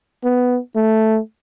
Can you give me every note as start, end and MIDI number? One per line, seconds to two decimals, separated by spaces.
0.24 0.59 59
0.76 1.19 57